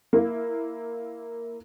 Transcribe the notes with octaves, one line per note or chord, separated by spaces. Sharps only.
A#3 E4